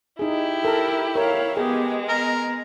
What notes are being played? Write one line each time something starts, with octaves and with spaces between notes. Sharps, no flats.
D#4 E4 G4 G#4
A4 A#4
A#4 C#5 F5
G#3 B3 G4 G#4
B3 A#4